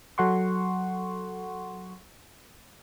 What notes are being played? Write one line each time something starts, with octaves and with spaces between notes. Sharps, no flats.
F#3 A4 F#5 C6 C#6